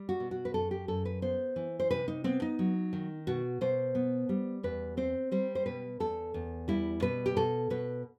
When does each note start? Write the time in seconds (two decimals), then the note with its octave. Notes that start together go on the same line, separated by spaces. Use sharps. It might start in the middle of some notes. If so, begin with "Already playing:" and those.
Already playing: G3
0.09 F#4
0.20 B2
0.31 F#4
0.45 B4
0.54 F#2 A4
0.71 G4
0.88 F#2 A4
1.05 B4
1.22 B3 C5
1.56 E3
1.80 C5
1.90 C3 B4
2.08 D#4
2.24 B3 C4
2.42 D#4
2.59 F#3
2.93 D#3
3.27 B2 F#4
3.61 B2 C5
3.95 B3
4.29 G3
4.63 E2 B4
4.97 C4 C5
5.32 G3 C5
5.55 C5
5.66 B2 B4
6.00 E2 A4
6.34 E2
6.68 G3 E4
7.02 B2 B4
7.26 G4
7.36 B2 A4
7.70 B2 B4